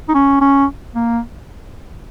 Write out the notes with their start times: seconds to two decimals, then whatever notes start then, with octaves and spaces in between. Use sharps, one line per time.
0.09 D#4
0.15 C#4
0.41 C#4
0.95 A#3